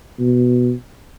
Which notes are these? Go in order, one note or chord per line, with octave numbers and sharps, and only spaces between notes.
B2